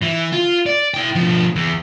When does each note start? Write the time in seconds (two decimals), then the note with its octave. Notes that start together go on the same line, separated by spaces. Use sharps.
0.03 E3
0.33 F4
0.66 D5
0.94 E4 G5
1.15 B2 F3
1.56 E2